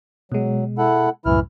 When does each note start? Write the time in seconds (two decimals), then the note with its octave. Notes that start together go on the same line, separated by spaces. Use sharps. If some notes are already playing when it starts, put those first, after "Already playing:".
0.32 B2 F#3 G#3
0.78 E4 A4 F#5
1.26 C2 F#2 A2 E3 E4 F6